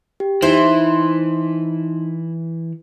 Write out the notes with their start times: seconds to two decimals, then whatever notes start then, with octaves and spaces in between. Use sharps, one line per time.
0.20 G4
0.42 E3 D#4 E4 C5